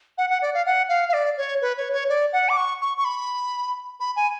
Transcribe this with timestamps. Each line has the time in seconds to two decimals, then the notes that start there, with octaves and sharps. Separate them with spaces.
0.18 F#5
0.30 F#5
0.42 D5
0.54 F5
0.66 F#5
0.89 F5
1.09 F5
1.13 D5
1.37 C#5
1.61 B4
1.77 C#5
1.93 C#5
2.09 D5
2.33 F#5
2.49 D6
2.57 C#6
2.81 C#6
2.98 C#6
3.05 B5
4.00 B5
4.16 G#5